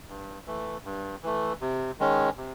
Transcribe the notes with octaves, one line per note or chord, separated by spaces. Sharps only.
G2
E3 A3
G2
E3 A3
C3
D#3 G#3 C#4
C3